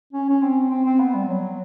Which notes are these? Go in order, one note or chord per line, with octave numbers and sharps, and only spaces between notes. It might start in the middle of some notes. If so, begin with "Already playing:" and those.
C#4
C#4
C4
C4
C4
B3
G3
F#3